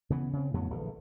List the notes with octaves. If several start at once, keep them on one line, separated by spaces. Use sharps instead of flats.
C#3 E3 B3
C#3 C4
F2 A2 F#3 B3
A#1 D3 E3